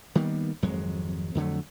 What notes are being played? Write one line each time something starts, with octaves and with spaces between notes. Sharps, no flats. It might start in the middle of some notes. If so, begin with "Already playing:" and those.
D#3 G3 A#3 B3
G#1 F2 F#3 G#3
F2 D3 F#3 A3